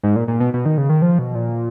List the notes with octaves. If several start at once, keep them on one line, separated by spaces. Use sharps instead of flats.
G#2
A#2
A#2
B2
B2
D#3
C#3
D#3
F3
B2
A#2